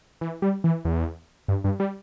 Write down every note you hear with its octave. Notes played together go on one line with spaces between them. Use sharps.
E3
G3
E3
E2
G2
G2
G3